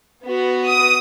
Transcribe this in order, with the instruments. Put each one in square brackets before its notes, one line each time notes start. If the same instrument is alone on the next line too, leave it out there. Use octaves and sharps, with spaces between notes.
[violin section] B3 F#4
D#6